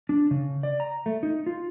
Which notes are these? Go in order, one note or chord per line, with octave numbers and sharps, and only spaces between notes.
D4
C#3
D5
A#5
A3
D#4
F4